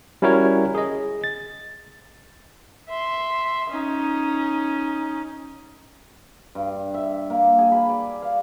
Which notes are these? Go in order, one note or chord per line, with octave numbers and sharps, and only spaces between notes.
G3 C#4 E4 F#4 A#4 C#5
G#4 D#5
A6
E5 C6
C#4 D#4
G2
E5
A#3
G#4
B5
D5
F5